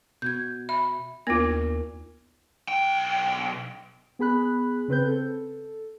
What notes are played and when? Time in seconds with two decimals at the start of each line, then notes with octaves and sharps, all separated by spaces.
0.22 B2 G6 G#6
0.69 E5 B5
1.27 D#2 A#3 B3 D4 F4 A#6
2.68 B1 G5
4.19 B3 G#4 B5 F#6
4.88 C#3 C4 B4 G6
5.05 A4